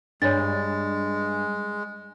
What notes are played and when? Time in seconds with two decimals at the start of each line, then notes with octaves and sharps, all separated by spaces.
0.22 G2 G#3 D4 C#5 A6